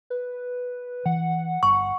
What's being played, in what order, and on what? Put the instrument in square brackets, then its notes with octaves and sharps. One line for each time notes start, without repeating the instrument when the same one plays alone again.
[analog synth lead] B4
[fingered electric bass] E3 [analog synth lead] F#5
[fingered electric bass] G1 [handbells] C#6